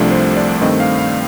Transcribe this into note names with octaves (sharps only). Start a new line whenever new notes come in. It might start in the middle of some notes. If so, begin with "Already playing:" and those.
Already playing: C2 C3 F3 A3 D4
C5
D5
G2 D#3 A3 C4 D#5
F5
F5